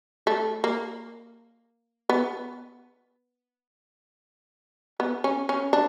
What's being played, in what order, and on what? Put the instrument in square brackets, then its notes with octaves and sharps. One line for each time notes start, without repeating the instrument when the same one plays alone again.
[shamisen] A3
A#3
B3
B3
C#4
C#4
D4